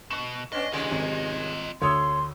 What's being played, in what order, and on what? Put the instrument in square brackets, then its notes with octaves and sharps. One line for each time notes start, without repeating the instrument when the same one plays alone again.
[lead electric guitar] B2 [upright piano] C#6 E7
[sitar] B3 C#4 D4 [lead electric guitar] D#5
[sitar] D#2 C3 G#3 [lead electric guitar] F4 D#5
[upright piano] G#1
[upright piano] D2 D#6 E6 [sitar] C#5 [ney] C6